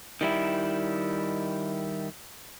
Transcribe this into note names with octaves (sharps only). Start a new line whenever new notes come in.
D#3 G3 E4